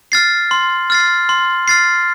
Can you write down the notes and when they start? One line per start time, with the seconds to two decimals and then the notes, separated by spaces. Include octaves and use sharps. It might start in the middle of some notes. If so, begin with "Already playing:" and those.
0.12 F6 A6 C7
0.51 C6
0.90 F6 A6 C7
1.29 C6
1.68 F6 A6 C7